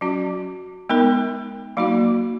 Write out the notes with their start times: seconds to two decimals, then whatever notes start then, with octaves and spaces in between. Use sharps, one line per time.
0.01 F#3 C#4 F#4
0.89 G#3 B3 D#4 A#4
1.77 F#3 A#3 D#4 F#4